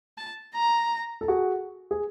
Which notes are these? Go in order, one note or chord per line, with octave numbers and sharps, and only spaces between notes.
A5
A#5
A4
F#4 G#4
G#4